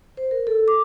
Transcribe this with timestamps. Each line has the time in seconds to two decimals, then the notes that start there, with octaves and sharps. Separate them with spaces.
0.17 C5
0.31 A#4
0.47 A4
0.68 D6